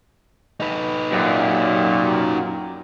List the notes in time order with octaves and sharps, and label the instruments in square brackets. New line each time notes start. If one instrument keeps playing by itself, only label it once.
[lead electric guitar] D#4 B4
[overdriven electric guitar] F#2 [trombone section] A#2 G4